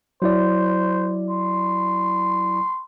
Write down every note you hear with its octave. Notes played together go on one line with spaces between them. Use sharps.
F#3 E4 C5 D5
C6